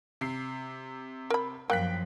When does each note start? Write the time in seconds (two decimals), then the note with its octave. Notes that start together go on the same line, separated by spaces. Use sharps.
0.21 C3 C7
1.30 A#4 B5
1.70 F#2 F3 A#3 G5 F#6 B6